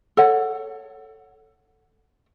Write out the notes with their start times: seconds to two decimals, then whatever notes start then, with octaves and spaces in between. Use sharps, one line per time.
0.17 A4 C#5 F#5